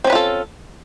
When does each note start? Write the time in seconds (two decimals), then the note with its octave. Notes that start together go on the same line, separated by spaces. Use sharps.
0.04 C4
0.07 C#4
0.10 B4
0.13 F4
0.15 A4